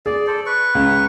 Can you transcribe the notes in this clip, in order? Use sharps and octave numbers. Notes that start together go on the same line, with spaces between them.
G#4 D5
A4 C5 D5
B4 C#6
C#2